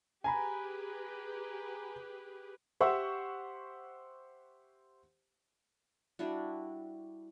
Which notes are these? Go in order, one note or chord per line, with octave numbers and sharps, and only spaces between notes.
G4 G#4 B4 G#5 A#5 B5
G4 C5 E5 F#5 C#6 E6
G3 D4 E4 F#4